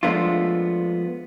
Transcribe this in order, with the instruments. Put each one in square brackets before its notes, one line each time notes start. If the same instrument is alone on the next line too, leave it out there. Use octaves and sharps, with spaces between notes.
[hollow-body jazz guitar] F3 G#3 A3 B3 D4 F4